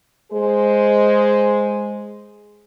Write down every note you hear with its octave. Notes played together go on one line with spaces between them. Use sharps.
G#3 G#4 C5